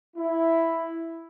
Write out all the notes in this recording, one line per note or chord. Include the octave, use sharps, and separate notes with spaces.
E4